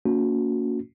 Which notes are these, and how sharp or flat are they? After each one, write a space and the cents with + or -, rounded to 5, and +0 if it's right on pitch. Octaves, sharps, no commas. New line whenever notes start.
A#3 -10 C#4 +35 F#4 -25